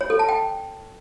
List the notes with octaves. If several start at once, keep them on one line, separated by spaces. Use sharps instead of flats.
C#5
A4
A5
G5